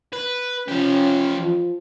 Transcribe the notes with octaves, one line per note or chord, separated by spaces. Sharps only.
B4
F3 C#4 G4
F3